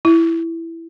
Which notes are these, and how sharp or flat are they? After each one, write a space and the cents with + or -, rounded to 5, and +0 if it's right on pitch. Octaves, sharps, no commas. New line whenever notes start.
E4 +5